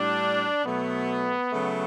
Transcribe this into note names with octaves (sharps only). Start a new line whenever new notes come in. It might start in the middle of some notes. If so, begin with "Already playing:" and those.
Already playing: A2 G3 D4
B2 F#3 A3 B3
C#3 F#3 A3